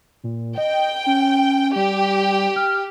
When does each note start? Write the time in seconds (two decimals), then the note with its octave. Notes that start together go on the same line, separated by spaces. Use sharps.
0.24 A#2
0.58 D#5 G5
1.06 C#4
1.76 G3 G4
2.56 F6